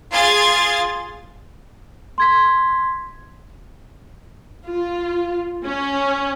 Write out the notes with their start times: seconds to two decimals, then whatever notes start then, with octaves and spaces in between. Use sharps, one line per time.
0.13 F4 G#4 C6 G#6 A6
2.18 C6 G#6 B6
4.67 F4
5.65 C#4